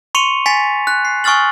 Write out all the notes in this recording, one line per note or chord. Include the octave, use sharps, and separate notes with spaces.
C6 C#6 C#7 D#7 F7
G#5 A6 B6 C#7 F7
F#6
C7
G#5 C#6 D#6 F6 A6 F#7